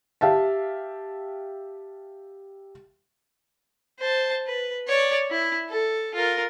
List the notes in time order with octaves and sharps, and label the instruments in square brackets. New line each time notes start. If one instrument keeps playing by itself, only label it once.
[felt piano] G4 E5 F5 A5
[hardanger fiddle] C5 A5
B4
C#5 D5
E4
A4
F4 A#4